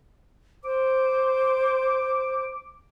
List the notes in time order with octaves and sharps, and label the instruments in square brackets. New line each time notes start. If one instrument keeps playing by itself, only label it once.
[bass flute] C5 [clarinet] D6